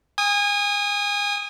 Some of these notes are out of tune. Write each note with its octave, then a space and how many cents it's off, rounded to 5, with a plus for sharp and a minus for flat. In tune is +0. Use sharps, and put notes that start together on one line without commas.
G#5 -30 D#6 +0